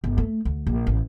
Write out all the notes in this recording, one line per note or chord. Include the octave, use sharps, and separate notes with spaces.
G1
A3
D2
A#1
A1